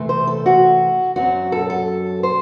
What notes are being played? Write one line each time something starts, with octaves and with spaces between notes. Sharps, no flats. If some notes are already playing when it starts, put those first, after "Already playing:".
Already playing: C3 E3 A3 C4
C5
A4
F#4
F#2 F#3 C4 F#4
A4
A4
C5